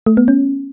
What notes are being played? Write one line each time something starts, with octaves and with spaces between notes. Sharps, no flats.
A3
B3
C#4